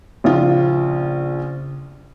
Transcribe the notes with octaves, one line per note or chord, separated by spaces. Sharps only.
A#1 C#3 F4